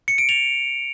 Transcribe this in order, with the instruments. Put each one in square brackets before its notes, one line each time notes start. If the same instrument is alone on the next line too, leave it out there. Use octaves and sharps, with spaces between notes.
[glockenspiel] C#7
D7
F7